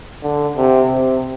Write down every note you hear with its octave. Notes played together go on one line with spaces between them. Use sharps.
D3
C3
C3